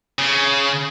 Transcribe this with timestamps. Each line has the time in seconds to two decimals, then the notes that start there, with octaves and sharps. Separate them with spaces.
0.19 C#3